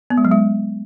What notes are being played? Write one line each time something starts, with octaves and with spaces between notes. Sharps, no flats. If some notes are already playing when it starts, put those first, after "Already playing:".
B3
G#3
F#3
G#3